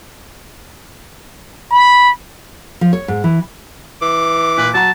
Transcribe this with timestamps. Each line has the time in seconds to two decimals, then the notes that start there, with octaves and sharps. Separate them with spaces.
1.71 B5
2.81 F3
2.93 C#5
3.08 G#2
3.24 E3
4.02 E3 D6
4.58 A#2 B4
4.74 F#3 F#5 A5 A#5